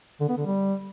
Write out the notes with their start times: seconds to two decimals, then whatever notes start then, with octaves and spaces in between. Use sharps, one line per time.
0.21 D3
0.29 B3
0.37 D3
0.46 G3